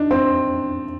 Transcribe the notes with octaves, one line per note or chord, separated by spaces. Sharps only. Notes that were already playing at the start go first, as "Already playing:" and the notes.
Already playing: D4 D#4
C4